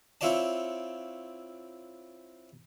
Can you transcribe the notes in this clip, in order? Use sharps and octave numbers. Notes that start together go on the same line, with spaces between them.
C4 E4 F4 C#5 D5 A5